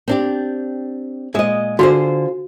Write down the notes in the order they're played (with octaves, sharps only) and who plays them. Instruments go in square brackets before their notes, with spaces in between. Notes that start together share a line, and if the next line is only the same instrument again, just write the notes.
[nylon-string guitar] C4 D4 G4
[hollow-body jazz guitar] A#2 G#3 [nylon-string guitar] D#5 E5
[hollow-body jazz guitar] D3 [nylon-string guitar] F4 G#4 C5 [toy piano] F#4